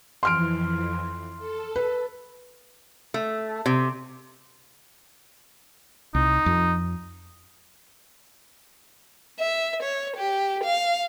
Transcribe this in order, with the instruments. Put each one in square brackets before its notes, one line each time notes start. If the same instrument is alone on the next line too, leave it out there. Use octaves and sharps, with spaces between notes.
[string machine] F2 E3 [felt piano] C6 F6 D7
[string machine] A4
[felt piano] B4
[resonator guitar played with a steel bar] A3
C3
[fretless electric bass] C2 [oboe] D#4
[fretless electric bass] F2
[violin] E5
C#5
G4
F5